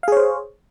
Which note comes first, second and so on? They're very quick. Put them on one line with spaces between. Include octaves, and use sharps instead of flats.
F5 G#4 C#5 C5